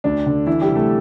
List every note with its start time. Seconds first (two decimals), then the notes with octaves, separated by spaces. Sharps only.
0.04 D2 D4
0.26 D3
0.47 E3 E4
0.61 G3 G4
0.68 C3
0.75 A3 A4